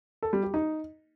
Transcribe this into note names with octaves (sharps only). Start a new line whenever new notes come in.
A4
G3
G4
D#4